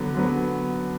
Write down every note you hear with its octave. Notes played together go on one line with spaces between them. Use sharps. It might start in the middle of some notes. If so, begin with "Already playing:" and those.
Already playing: D3 F#3 B3
D3 F#3 B3